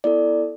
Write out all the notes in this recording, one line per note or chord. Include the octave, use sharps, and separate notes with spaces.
B3 E4 A4 D5